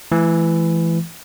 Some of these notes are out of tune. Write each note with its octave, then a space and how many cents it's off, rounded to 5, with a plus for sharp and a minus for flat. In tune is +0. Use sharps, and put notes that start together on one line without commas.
E3 +15 A3 -35